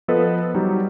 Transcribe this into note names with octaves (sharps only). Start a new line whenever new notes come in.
F3 B3 A4 B4 D#5
F#3 G3 D#4 G4